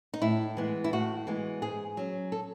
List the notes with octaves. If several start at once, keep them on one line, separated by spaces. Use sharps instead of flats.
D#4
A2 E4
E3 G#3 B3
E4
A2 F#4
E3 G#3 B3
G#2 G#4
F#3 C#4
A4